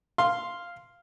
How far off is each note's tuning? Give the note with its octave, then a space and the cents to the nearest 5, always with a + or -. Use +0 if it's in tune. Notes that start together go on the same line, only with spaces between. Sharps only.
F5 -5 C6 +0